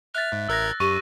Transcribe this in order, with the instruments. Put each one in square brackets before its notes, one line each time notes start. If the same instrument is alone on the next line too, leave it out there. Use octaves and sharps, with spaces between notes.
[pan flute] E5 [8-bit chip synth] F6 [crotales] F#6 A6
[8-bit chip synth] G#2
[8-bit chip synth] A1 A#4 G#6 [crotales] E6 F#6 A#6
[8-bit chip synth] F#2 [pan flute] G4 [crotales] C#6 D#7